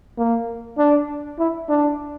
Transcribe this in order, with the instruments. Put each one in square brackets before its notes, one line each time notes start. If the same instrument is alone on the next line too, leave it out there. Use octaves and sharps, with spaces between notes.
[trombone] A#3
D4
E4
D4